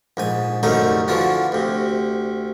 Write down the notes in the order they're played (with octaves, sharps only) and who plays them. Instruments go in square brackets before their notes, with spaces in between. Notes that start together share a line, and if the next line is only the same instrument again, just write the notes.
[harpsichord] A#1 G#2 G#5
C2 F#2 D3 A3 D#4 A#5
D3 E3 F3 F4 F#4
D2 C3